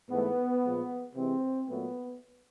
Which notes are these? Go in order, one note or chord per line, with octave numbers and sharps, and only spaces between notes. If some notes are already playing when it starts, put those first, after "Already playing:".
G#2 E3 A3 B3
A#2 F3 G#3
C3 E3 G#3 C4
A#2 F#3 A3 B3